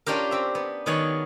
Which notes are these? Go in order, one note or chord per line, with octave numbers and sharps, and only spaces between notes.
C#4 D4 F4 G4 A#4
C4 E5
B3
D#3 F#3 B3 G#4 C#5